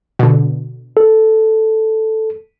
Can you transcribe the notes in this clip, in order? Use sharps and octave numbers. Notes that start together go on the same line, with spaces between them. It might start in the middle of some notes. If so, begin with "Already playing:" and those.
B2 D3
A4